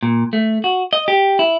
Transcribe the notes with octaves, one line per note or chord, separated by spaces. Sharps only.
A#2
A3
F#4
D#5
G4
E4